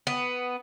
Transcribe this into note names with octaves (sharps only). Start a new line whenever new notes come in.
B3